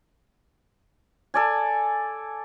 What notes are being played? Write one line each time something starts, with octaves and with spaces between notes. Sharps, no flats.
A4 D5 G#5